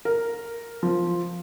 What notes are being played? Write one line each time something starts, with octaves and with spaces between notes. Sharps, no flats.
A#4
F3